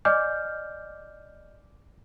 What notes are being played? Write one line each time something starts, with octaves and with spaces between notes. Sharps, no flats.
D5 D#5 G#5 D6 F6 G6